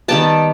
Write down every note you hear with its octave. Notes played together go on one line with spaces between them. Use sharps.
D#3 G3 B3 G5 A5